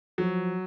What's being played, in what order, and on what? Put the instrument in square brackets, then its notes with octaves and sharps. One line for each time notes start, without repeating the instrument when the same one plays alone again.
[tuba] F3 [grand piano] F#3